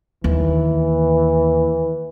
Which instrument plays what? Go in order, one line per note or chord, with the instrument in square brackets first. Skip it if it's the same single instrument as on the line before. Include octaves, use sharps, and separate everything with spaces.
[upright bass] D#2 [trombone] E3